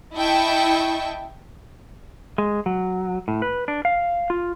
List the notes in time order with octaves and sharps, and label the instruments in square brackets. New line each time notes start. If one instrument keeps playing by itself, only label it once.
[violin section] E4 D#5 E5 G5 A5 C#6
[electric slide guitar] G#3
F#3
A2
B4
D4
F5
F4